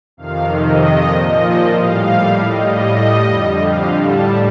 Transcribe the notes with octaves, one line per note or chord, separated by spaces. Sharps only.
F2 C3 D#3 F5
D#5
A#2 F3
D#5
A2 G3 F5
A2 G3 D#5
F2 D3 G3
F5
A2 G3 A5